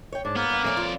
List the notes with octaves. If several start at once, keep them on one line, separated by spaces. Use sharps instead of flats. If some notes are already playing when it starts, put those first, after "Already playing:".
C#5 G5
G#2 D4
A#3 B3
G2
F2 A3 C#4 D5
F4